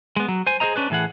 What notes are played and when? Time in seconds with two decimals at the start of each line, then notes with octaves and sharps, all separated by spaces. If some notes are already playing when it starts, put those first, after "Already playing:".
0.16 G#3 B3
0.28 F#3
0.47 C5 G#5
0.60 G#4 A#4 C5 D#5 A#5
0.76 C#4 D4 B4
0.90 A2 E3 G#4 F#5